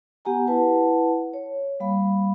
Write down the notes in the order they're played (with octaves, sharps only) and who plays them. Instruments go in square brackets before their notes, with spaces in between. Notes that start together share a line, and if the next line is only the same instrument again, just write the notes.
[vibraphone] B3 G4 F#5 G#5 A#5
E4 B4 F#5 A5
C#5
G3 A#3 F5 B5